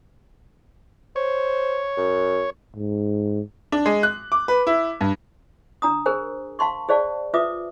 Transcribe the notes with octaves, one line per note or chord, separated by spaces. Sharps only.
C5 C#5
F#2
G#2
D4
G#3
F#6
D6
B4
E4
G2
D4 A#5 D#6
G#4 A#4 C5 G#5
F5 A5 C6 C#6
G#4 C5 D5 F5 A5
F4 B4 E5 D6 D#6